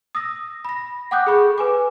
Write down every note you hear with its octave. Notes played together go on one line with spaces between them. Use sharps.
D#6 E6 A#6
B5 A#6
F#5 G5 D6 D#6 F#6 G6
G#4 A4 B5 C#6
B4 G#5 D6